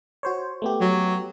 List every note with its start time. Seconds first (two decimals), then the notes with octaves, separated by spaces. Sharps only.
0.23 F#4 C5 C#5
0.62 A3 B3 G4
0.81 F#3